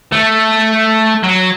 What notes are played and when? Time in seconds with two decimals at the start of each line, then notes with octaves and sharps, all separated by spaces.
0.12 A3
1.24 F#3